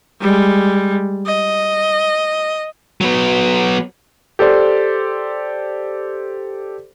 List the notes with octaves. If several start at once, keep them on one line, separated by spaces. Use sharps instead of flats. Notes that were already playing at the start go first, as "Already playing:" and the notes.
G3 G#3
D#5
F#3 B3
G4 A4 C5 D5 C6